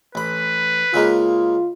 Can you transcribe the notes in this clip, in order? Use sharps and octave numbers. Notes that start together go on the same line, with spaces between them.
A1 B4 B5
C#3 G#3 A#3 F4